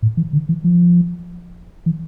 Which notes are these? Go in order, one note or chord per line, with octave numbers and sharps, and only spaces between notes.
A2
E3
D3
E3
F3
E3